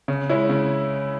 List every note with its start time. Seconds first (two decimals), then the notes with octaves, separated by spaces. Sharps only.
0.08 C#3
0.29 G#3 C#4 E4
0.49 C#3